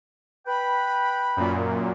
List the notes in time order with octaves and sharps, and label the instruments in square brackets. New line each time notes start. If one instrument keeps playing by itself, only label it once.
[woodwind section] B4 G5 B5
[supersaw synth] F#2 A#2